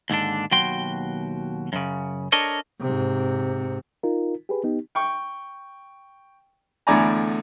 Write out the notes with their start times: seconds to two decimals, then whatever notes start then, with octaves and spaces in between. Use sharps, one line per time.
0.10 D#2 G#2 D3 D4
0.51 D#2 B2 F#3 F#4 G5 C6
1.73 F#2 C#3
2.32 D4 A4 A#4 C#5 D#5
2.81 G#2 C3
4.03 D#4 F4 A#4
4.49 G4 G#4 B4
4.64 B3 D#4 G4
4.95 G5 C#6
6.87 E2 A2 D3 D5 G#5 A#5